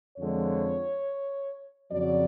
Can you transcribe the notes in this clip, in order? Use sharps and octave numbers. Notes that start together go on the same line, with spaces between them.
F2 D3 F3 G#3 C#5
F2 C#3 F#3 D5